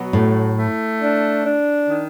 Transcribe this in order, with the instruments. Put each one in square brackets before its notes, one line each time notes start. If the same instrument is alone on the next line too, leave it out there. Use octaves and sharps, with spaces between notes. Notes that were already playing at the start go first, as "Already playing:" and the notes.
Already playing: [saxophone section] B2 F#3
[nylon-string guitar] A2 [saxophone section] A3
[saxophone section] A3
D4
D4
D#3